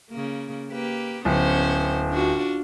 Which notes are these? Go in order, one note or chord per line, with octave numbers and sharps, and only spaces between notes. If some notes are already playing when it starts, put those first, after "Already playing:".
C#3 A#3
A#3 G4 B4
D1 B3 C#4 C5
D4 F4 F#4